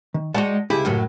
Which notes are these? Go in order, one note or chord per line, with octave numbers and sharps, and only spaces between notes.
D#3
G#3 D#4 F#4 D5 F#5 A5
C#2 D#3 E4 G4 G#4
F#2 A2 F#3